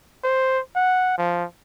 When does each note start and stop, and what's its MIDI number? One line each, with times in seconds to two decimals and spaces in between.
0.24 0.60 72
0.76 1.17 78
1.18 1.45 53